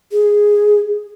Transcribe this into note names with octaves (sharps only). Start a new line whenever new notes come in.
G#4